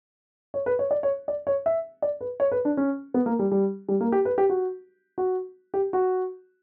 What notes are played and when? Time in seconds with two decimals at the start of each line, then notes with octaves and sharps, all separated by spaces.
0.54 C#5
0.66 B4
0.79 C#5
0.91 D5
1.03 C#5
1.28 D5
1.47 C#5
1.66 E5
2.02 D5
2.21 B4
2.40 C#5
2.52 B4
2.65 D4
2.77 C#4
3.14 B3
3.26 A#3
3.39 G3
3.52 G3
3.89 G3
4.01 A#3
4.12 G4
4.25 B4
4.38 G4
4.50 F#4
5.18 F#4
5.74 G4
5.93 F#4